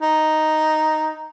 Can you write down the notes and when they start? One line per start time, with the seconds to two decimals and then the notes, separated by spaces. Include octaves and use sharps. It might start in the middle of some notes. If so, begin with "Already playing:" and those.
0.02 D#4